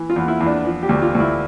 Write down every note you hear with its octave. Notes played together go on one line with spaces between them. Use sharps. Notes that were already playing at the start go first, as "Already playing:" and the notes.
Already playing: E3
F4
E2
E4
E2
D4
F3
G4
D2
F4
D2
E4